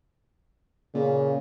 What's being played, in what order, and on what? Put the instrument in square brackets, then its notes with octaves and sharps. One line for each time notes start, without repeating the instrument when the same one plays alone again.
[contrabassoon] A#2 [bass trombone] C#3